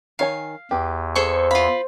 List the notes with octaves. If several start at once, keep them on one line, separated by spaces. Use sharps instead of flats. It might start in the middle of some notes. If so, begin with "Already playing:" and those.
D#3 C#5 F5 G#5
E2 G4 B4
G#4 A4 C5 C#6
F4 F5 B5